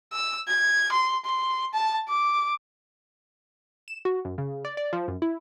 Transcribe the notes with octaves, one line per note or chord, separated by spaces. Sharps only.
E6
G#6
C6
C6
A5
D6
E7
F#4
F#2
C#3
D5
D5
F3
F#2
E4